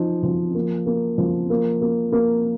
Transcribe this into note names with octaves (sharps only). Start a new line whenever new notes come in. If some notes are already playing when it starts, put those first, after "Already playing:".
Already playing: F3 D#4
F3
A#3
A#3
F3
A#3
A#3
A#3